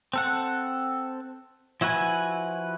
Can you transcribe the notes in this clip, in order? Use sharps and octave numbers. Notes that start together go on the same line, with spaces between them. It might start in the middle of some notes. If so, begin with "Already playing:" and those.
C4 A4 F#5
F3 E4 F#4 B4 G#5